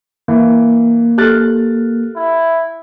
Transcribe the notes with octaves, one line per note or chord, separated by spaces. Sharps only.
E3 A#3
G4 A4 F6 F#6 A6
E4